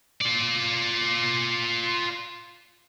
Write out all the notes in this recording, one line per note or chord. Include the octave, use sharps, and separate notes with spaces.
F4 D5